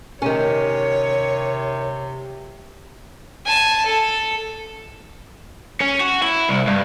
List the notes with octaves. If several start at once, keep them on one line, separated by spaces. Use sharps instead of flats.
C3 D#3 C#4 C#5
G#5 A5
A4
C#4
F#4
E4
C2
G2